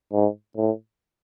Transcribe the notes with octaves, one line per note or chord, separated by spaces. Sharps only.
G#2
A2